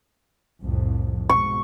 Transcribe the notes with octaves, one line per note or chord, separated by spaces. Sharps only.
C2 F2 A2
G#2 B2 C#6